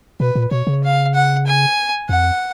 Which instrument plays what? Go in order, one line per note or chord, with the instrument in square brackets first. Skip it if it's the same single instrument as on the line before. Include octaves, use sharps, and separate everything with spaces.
[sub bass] B2 [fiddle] B4
[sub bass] A#2
[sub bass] B2 [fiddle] C#5
[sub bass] C#3
[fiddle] F5
F#5
G#5
[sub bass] F2 [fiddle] F#5